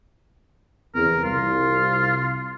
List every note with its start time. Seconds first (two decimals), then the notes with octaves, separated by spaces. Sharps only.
0.95 E2 C3 A#4
1.24 C2 F4